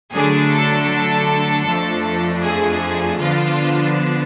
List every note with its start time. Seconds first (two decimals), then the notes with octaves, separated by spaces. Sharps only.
0.13 D3 F#3 A3 D4 G#4
0.52 A4
1.67 F2 F3 A3 D4
2.43 G#4
3.20 D3 F3 B3 D4 F4